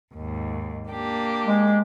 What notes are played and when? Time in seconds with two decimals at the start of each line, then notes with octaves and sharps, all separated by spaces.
0.14 D#2 G#2
0.90 A#3 D4 G4
1.47 G#3